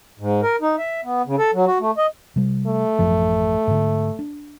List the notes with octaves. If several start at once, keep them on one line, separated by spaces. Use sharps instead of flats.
G#2
A#4
D#4
E5
B3
C#3
A4
F#3
F#4
A3
D#5
C3 G3
A3
A1 F#2 F3
G#2 D3
D4